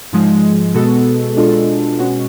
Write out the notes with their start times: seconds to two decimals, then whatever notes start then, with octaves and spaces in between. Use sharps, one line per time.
0.13 G#2 F3 G#3
0.74 B2 G#3 B3 F#4 A4
1.36 B2 G#3 D4 F4 A4
1.99 B2 G#3 C#4 F#4